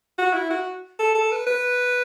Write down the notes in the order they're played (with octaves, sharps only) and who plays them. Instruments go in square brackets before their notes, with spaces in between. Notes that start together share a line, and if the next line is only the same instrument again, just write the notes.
[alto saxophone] F#4
E4
F#4
A4
A4
B4
B4